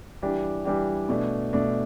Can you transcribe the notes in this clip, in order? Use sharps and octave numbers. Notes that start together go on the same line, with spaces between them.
E3 G3 D4 G4
E3 G3 D4 G4
B2 A3 D4
B2 A3 D4